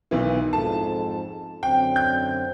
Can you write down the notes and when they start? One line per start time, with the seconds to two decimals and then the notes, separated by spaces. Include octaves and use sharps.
0.11 B1 D#3 E3
0.53 F2 G#2 A4 A5
1.63 F#2 D3 C4 G5
1.96 G6